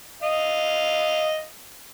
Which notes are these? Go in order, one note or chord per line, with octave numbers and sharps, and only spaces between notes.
D#5 F5